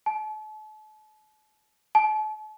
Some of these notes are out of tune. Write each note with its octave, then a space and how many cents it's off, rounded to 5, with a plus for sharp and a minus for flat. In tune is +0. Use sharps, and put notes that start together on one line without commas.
A5 -40
A5 -40